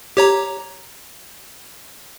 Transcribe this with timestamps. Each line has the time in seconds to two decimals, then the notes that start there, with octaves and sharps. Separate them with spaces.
0.17 G4 C#5 A#5